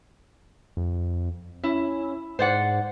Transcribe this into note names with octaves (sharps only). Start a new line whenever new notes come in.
F2
C#4 E4
G#2 C5 D5 F#5